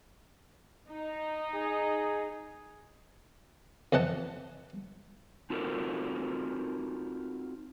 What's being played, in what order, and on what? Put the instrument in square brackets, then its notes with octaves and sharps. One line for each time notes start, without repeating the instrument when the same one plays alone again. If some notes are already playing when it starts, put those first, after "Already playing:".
[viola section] D#4
[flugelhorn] G#4
[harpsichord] F2 E3 D#5 F#5 A5
[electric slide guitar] C4 D#4 F4 F#4 A4 A#4